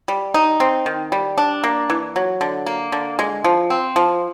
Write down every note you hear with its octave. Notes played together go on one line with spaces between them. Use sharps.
G3
D#4
C4
D#3
G3
D4
A#3
E3
F#3
D3
A#3
D3
G#3
F3
C4
F3